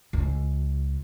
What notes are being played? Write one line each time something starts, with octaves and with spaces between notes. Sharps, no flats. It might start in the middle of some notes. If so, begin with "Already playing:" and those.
C#2